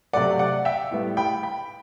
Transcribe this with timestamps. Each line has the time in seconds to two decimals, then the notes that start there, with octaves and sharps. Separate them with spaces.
0.13 C3 F#3 A3 D5 F#5
0.39 D5 F#5
0.65 E5 G5
0.91 A2 G3 B3
1.17 G5 B5
1.43 G5 B5